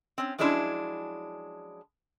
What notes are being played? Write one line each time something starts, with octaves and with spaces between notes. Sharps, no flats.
C4 C#4
F3 F#3 G#3 C#4 D4 E4